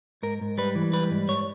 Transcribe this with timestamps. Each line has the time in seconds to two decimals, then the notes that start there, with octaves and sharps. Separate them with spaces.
0.23 G#2 A#4
0.41 G#2
0.58 G3 B4
0.75 E3
0.93 G3 B4
1.11 G#2
1.29 G#2 C#5